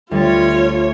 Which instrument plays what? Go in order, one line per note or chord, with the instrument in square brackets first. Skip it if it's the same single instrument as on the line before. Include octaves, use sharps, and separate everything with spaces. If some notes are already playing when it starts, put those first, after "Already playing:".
[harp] D2 G3 A6 [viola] F4 C#5